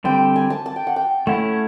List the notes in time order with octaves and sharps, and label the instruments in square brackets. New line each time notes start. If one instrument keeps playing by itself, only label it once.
[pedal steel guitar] D3 G3 C4 [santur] G5
[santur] G#5
A5
A5
G5
F#5
G5
[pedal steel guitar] A3 C#4 E4 [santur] F#5